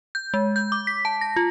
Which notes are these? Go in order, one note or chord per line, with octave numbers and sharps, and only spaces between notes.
G6
G#3
G6
D6
B6
A5
A#6
F4